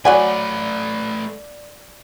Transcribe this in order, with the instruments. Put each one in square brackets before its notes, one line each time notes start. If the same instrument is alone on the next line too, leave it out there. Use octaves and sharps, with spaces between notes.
[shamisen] F#3 F#5 G#5 [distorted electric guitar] A3 B4 [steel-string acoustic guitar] D5